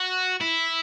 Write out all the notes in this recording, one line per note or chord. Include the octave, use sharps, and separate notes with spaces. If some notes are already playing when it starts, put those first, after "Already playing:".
Already playing: F#4
E4